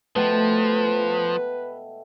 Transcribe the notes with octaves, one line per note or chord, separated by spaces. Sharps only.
B2 F3 A3 B4 G5